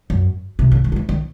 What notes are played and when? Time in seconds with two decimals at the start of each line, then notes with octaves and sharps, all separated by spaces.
0.10 F#2
0.59 C3
0.72 C#3
0.84 D#3
0.92 F3
0.96 E3
1.09 D#3